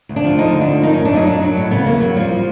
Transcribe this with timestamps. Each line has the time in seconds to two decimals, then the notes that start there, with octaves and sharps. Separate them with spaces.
0.09 D2
0.16 D4
0.24 F3
0.38 D3 D#4
0.53 D2
0.61 D4
0.68 F3
0.83 D#3 D#4
0.94 F#2 C#4
1.05 D4
1.13 F#3 D#4
1.27 F#3 D4
1.42 F#3
1.57 A2
1.71 C#3 B3
1.86 E2 A#3
2.00 F#3
2.16 F3 G3
2.31 F3